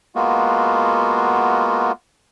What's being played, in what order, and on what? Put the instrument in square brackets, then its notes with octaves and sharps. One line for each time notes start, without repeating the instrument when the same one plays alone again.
[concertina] G#3 A#3 B3 F4 F#4